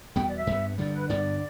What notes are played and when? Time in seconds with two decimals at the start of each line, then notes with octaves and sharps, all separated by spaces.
0.16 E2 B2 G3 B3 G5
0.26 D5
0.37 E5
0.47 G2 G3 B3
0.78 G2 D3 G3 D5
0.94 B4
1.09 G2 D3 G3 B3 D5